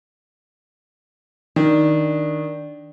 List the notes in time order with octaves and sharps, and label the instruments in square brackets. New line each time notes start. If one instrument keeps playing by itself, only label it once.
[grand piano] D#3 [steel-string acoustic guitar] D4